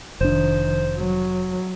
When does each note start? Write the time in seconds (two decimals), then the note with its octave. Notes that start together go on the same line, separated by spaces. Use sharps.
0.21 F1 D#3 F3 D4 C5
0.97 F#3